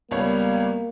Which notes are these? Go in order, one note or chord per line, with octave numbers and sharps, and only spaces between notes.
C#2 G3 A#3 B3 C#5